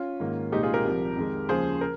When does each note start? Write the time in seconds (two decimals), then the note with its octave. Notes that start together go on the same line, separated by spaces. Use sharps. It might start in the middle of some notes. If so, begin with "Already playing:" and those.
Already playing: C#4 F4
0.20 G#2 D#3 A#3
0.52 C2 A#2 G#3 C4 D#4 G4
0.63 F4 G#4
0.74 G4 A#4
0.85 C2 C3 F3
1.17 F2 D#3 G#3
1.49 D#2 C#3 F3 G#4 C5
1.81 A#4